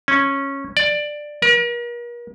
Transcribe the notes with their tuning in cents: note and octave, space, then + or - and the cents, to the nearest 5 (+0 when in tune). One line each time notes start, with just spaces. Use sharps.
C#4 -10
D5 +10
A#4 +40